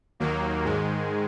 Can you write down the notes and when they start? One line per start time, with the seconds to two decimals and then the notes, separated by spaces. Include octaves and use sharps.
0.20 D#2 D#3 F#3 A#3
0.65 G#2 D#3 G#3